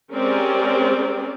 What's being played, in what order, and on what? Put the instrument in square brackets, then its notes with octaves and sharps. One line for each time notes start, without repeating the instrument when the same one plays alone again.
[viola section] G#3 C4 C#4 G4 A#4 D5